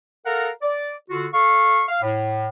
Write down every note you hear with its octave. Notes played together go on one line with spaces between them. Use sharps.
A4 A#4 F5 F#5 A#5
D5
D3 F4 F#4
A4 F5 C#6
F5
A2